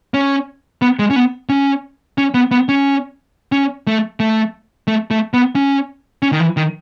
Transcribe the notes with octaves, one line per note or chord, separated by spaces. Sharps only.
C#4
B3
G#3
C#4
B3
C#4
C#4
B3
B3
C#4
C#4
A3
A3
A3
A3
B3
C#4
C#4
D#3
E3
D#3